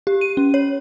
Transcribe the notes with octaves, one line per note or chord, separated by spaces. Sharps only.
G4
D#7
C#4
C#5